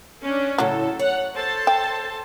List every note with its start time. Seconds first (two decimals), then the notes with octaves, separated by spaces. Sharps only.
0.23 C#4 D4
0.58 A2 C#3 F#3 A4
0.99 C#5 F#5
1.33 A4 C5 A5
1.67 G5